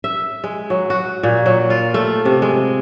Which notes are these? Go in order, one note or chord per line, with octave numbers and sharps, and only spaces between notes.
E5
G#3
F#3
F#4
A#2
F#3
F4
A3
C3
G#3